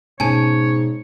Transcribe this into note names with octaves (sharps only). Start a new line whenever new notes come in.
G#2 B2 C#4 C#5 G#5 A5 G#6